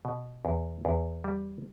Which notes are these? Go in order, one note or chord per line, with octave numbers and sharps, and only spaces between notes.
B2
E2
E2
G3